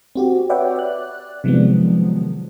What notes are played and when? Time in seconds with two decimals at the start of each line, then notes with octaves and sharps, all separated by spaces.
0.15 C4 F#4 G4
0.49 B4 C#5 D5 E5 F#5 G5
0.76 D5 F#6
1.44 C3 D#3 F3 F#3 G#3 B3